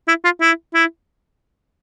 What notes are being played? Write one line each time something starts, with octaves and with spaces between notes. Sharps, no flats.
E4
F4
E4
E4